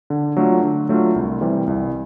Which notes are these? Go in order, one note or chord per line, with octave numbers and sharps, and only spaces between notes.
D3
F#3 A3 D4 F4
D3
F#3 A3 D4 F4
C2
C3 E3 G3
C2